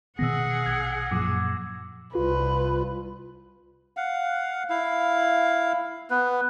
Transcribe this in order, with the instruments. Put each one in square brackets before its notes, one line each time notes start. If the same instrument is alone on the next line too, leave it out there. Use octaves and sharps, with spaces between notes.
[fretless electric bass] B2 D#3 B3 [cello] G#4 F#5 [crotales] E6 A#6
[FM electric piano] A#1 [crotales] G#6
[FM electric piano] F#2 A#2 F3 [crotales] D6
[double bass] C2 [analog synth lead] F4 [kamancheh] B4
[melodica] F5 F#5
E4 F5
B3 B4